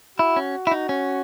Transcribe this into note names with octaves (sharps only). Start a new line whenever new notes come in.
E4 F#4
C#4
E4
D#4
C#4